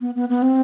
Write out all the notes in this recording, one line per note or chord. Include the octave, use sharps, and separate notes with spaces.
B3
B3
B3
C4